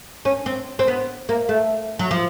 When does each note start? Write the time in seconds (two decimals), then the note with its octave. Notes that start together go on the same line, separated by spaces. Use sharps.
0.25 C#4
0.46 C4
0.79 C4
0.88 B3
1.29 A#3
1.49 A3
1.99 F#3
2.11 F3